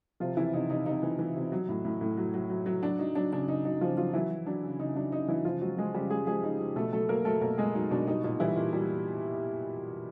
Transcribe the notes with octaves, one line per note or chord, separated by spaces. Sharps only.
C3 F3 F4
C3 E3 E4
C3 D#4
C3 D#4
C3 D#4
E3
E3
C3
F#3
A2
A2
A2
F#3
F#3
F#3
F#3
F#3 D4
F#3 D#4
F#3 D4
C#3 D4
C#3 D#4
F#3 D#4
C#3 F3 F4
F3 F#3 F4
E3 F#3 E4
F#3
F#3 D4
C#3
C#3 D#4
F#3 D4
C#3 D#4
E3 F#3 E4
C#3 F3 F4
F#3 G#3 F#4
F3 G#3 G#4
C#3 G3 G4
C#3 G#3 G#4
F3 G#3 G#4
C#3 D#4
F3
B2 A3 A4
F#3 A3 A4
F#3 A#3 A#4
F#3 A3 A4
B2 A#3 A#4
B2 G#3 G#4
F#3 D#4
B2 D4
G3 D#4
A#2 D#4
E3 G3 E4
A#2
G3